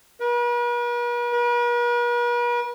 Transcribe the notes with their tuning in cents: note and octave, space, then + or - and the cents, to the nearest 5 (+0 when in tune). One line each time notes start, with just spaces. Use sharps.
B4 -45
B4 -45